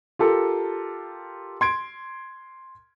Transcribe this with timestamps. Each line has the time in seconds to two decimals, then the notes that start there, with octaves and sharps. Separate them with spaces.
0.19 F4 G4 A4 A#4
1.61 C6 G#6 D7